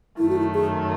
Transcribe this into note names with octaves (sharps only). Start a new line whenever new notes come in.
F#2 D#3 A3 E4
F#4
E4
G#4